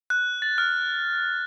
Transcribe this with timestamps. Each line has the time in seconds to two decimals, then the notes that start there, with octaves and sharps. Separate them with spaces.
0.10 F#6
0.42 A6
0.58 F6